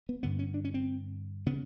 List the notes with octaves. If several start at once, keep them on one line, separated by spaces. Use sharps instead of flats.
B3
G2 D3 B3
C#4
D4
C#4
C4
C#3 B3